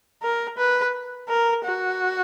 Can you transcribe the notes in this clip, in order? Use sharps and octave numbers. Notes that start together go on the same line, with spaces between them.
A#4
B4
A#4
F#4